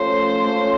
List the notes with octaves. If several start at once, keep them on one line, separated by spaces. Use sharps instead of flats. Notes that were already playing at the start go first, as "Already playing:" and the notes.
Already playing: F3 A3 C#4 F4 C5
F3 A3 C#4 F4